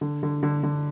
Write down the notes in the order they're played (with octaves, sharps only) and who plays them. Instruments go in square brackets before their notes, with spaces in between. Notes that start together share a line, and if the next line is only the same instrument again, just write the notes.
[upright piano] D3
D3
D3
D3